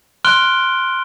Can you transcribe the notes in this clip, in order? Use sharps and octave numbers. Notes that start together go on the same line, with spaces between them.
C6 F6 F#6 D7 G7